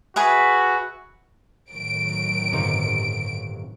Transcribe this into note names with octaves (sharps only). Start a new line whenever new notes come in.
F#4 G#4 B4 E5
A2 D#3 F#3 D7
G1 C3 D#4